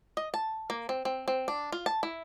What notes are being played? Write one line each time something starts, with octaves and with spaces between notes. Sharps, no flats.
D#5
A5
A#3
C4
C4
C4
D4
F4
A5
E4